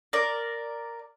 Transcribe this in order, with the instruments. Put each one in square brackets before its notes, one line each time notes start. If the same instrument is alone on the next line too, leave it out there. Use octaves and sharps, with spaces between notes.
[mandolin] A#4 D5